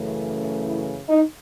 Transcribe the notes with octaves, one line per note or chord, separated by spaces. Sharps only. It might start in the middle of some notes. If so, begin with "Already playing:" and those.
Already playing: F#2 C#3 E3 A3
E4
D#4